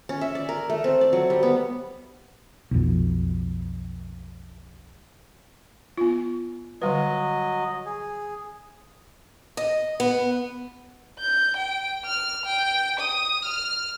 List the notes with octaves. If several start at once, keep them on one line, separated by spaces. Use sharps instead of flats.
C#4
E5
D5
A#4
A3
C4
D5
F#3
G3
B3
B1 F2
B3 F4
D3 F#3 G3 B4 D#5
G#4
D#5
B3
G6
G5
F6
G5
D#6
F6